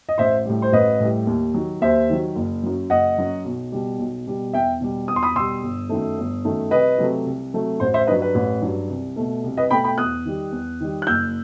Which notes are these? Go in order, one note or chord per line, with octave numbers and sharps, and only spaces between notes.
D#5
A1 C5 E5
A2 G3
C5
A1 B4 D#5
A2 G3
D#2
D#3 F#3
D#2 C5 E5
D#3 F#3
F#1
F#2 F#3
F#1 D#5 F#5
F#2 F#3
B1
B2 G3
B1
B2 G3
E2 E5 G5
B2 G3
E2 D#6
C6
B5 D#6
B2 G3 C6 E6
G1
F#2 D#3 A3
G1
F#2 D#3 A3
C2 B4 D#5
C3 F#3 A3
C2
C3 F#3 A3
A1 C5
C5 E5
G2 F#3 B4 D#5
B4
A1
G2 F#3
C2
B2 A3
C2
B4 D#5
B2 A3 G5 B5
G5 B5
E2 D#6 F#6
D#3 G3
E2
D#3 G3
F#6
F#1 E6 G6